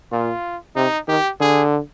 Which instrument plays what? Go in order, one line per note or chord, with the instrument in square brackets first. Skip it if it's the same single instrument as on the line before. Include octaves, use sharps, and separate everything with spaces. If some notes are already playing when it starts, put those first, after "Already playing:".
[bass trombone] A#2 [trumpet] F4
[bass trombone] C3 [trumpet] D#4
[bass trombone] D#3 [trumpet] G4
[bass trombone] D3 [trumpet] G#4